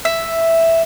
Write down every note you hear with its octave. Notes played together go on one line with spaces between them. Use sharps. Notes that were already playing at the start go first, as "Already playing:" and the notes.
E5